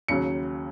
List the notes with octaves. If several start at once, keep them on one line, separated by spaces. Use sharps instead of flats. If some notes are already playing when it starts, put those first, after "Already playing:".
D#2 C#3 F#3 C#7